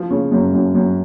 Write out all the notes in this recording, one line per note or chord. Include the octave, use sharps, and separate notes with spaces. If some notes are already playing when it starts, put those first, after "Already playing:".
Already playing: F3
C#3
F#2
F#2
F#2